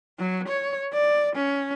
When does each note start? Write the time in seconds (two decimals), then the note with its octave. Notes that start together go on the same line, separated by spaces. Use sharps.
0.19 F#3
0.48 C#5
0.93 D5
1.35 C#4